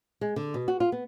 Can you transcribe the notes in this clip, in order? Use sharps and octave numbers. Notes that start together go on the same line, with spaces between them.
G#3
D3
B2
F#4
F4
B3